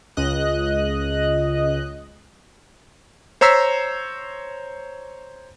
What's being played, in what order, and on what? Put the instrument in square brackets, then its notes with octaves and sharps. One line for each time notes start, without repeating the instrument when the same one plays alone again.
[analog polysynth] C#2 D#5 F#6
[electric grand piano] C5 C#5 A#5 E6 B6 C7